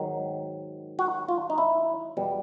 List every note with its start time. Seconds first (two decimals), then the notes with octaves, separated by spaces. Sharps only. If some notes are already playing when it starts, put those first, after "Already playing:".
Already playing: G#2 D#3 F#3
0.99 F#4
1.29 F4
1.50 D#4
1.58 E4
2.17 E2 B2 G3